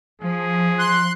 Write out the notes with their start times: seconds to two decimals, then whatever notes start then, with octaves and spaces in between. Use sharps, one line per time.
0.21 F3 G#4
0.79 C6 F#6